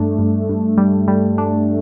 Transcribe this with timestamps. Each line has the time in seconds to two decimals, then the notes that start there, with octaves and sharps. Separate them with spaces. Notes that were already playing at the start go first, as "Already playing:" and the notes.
Already playing: G2 A3 D4
0.18 G2
0.49 G2
0.78 G3
1.08 G3
1.38 D4